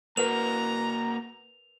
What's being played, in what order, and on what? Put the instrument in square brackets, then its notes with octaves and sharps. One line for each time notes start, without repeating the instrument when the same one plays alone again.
[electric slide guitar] A#3 F#4 [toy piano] A#4 B4 F#5 [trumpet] A#5 [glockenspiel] F7